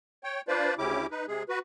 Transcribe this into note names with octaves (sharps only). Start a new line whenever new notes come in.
C#5 G5
D4 F4 B4 C5 D5
D2 C#3 C#4 E4 G4 D6
D#4 B4
C3 G#3 G#4
F#4 B4